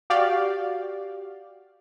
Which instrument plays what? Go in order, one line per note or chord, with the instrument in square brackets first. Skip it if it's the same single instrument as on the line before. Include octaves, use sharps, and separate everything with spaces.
[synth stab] F#4 G4 D5 F5